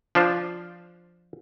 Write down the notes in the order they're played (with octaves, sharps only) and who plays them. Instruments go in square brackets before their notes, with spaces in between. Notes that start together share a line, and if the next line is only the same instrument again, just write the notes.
[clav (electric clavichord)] F3 D4 F4 C5